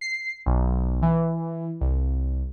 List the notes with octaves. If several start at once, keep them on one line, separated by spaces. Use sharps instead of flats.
C7
B1
E3
C2